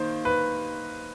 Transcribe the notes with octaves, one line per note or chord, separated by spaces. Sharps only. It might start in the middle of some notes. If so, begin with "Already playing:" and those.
Already playing: D#3 A#3 C5
B4